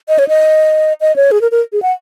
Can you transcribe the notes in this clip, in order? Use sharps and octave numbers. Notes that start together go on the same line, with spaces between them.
D#5
C#5
D#5
D#5
C#5
G#4
A#4
A#4
G#4
F#5